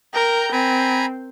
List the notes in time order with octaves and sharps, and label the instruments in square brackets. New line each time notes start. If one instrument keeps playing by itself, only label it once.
[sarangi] A#4 [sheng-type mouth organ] G5 A#5
[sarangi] C4 [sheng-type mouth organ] G#5 A#5 B5